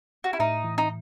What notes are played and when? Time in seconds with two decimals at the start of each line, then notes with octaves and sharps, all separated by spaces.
0.24 F#4
0.33 E4
0.40 A2 D#4
0.64 E3
0.78 D#4